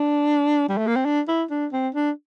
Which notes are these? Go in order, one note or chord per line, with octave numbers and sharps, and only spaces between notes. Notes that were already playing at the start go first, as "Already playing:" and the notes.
Already playing: D4
G3
A3
A#3
C4
D4
E4
D4
C4
D4